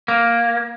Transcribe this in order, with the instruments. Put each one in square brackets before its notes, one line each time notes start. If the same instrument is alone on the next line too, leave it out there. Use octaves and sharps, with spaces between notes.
[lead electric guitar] A#3